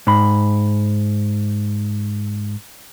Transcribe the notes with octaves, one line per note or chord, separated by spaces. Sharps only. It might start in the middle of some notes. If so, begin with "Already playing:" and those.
G#2 B5